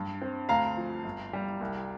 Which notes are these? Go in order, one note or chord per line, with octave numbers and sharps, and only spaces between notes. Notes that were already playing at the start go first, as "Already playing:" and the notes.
Already playing: G2
C4
D2 F5 A#5
F3
G1
G3
C2